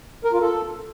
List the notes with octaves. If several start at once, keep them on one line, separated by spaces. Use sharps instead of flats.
A#4
F4
A4